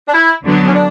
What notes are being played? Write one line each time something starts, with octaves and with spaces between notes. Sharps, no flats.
D4
E4
D3 F#3 B3 D4
C#4
D4